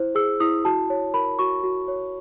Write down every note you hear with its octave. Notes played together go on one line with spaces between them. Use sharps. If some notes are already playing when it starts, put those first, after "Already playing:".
Already playing: E4 C5
G#4 E6
E4 D#6
F#4 A5
C#5
A#4 B5
F#4 C#6
F#4
C#5